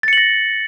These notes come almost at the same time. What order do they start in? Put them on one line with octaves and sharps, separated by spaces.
A6 C#7 F#7 A#6